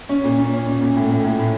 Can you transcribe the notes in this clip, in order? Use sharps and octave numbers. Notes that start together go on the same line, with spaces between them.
C#4
A#2
C#4
C#4
A#2
A#2
A2
A2
A2
A2